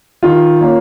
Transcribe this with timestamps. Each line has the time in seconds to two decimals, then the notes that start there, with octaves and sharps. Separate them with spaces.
0.23 D#3 F4
0.61 A#3 C#4